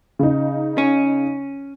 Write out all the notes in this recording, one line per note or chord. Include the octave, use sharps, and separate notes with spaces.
C#3 D#4
C#4